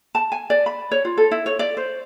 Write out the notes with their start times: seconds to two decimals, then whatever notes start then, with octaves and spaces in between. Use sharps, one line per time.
0.15 A5
0.32 G#5
0.50 D5
0.66 B5
0.91 C#5
1.05 F4
1.17 A4
1.31 E4
1.46 C#5
1.59 D5
1.77 C5